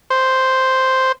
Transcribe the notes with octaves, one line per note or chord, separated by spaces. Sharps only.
C5